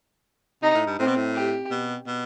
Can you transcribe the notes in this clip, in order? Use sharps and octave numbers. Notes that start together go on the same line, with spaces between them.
C3 D#4
A2
G2
A2 C4
B2
A2
G4
B2
B2